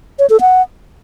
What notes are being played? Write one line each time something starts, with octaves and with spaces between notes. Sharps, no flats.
C#5
A4
F#5